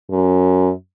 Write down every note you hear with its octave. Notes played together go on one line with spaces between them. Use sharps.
F#2